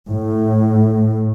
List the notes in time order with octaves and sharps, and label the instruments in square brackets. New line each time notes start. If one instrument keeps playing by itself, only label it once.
[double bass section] A2